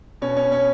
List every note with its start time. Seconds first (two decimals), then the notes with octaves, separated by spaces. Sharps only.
0.21 B2 C#4
0.37 C#4
0.52 C#4